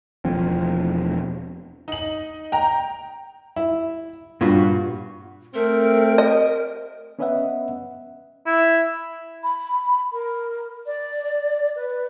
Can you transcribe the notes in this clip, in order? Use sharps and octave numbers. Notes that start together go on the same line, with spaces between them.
E1 F3 C4
D#4 F#7
G5 A#5
E4
G2 A#2 F4 F#4
A3 C4 A#4
D#5
B3 C#4 B4 D#5 E5 F#5
E4
B5
A#4
D5
B4